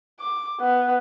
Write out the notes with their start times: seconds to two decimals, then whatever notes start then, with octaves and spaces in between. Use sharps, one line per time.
0.20 D6
0.61 B3